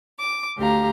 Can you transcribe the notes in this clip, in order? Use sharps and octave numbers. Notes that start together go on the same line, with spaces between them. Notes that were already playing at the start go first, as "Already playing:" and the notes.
D6
D2 G4 F5 A#5